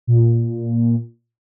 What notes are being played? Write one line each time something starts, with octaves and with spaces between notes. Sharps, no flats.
A#2